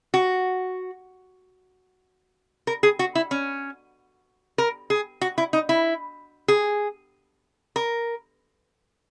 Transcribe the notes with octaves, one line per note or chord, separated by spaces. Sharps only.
F#4
A#4
G#4
F#4
E4
C#4
A#4
G#4
F#4
E4
D#4
E4
G#4
A#4